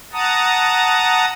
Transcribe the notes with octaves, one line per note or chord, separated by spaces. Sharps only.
F#5 A5 A#5 D#6